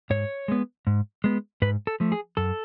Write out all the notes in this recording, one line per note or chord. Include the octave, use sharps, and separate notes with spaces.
G#2 C#5
G#3 B3
G#2
G#3 B3
G#2 B4
A4
F3 A3
G#4
F#2 A4